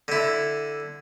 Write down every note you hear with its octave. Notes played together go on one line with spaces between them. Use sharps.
D3 E4